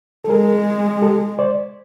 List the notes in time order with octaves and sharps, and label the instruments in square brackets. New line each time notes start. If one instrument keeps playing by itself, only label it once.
[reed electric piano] A4
[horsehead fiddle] G#3 [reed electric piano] G#4 A#4
[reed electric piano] G4 A4
C5 D5